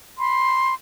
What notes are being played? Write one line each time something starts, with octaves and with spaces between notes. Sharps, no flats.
B5 C6